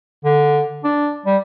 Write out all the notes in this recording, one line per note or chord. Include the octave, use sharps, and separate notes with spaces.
D3
D4
G3